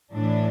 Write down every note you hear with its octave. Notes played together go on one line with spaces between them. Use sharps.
A2 E3 D4